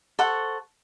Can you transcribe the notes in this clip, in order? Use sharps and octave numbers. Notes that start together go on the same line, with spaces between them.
A4 C5 F#5 C#6